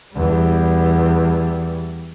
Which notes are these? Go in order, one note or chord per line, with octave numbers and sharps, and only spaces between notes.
E2 G3